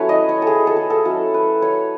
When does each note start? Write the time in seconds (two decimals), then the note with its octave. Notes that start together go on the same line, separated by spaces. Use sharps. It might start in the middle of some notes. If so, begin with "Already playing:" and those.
Already playing: F#3 C#4 E4 A4 B4 C#5
0.09 D#5
0.29 C#5
0.42 G#4 A4
0.67 A4
0.77 G#4
0.90 A4
1.05 F#3 C#4 E4 A4
1.34 B4
1.62 C#5